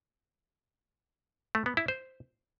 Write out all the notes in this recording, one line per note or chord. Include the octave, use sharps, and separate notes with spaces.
A3
B3
E4
C5